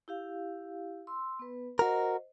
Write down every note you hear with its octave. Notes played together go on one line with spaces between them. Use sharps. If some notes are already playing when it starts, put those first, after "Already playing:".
E4 G4 F5
C6 E6
B3 B4
F#4 A#4 C5 D#5